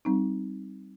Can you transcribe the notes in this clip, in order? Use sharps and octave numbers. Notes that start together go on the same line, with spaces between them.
G3 C4 D#4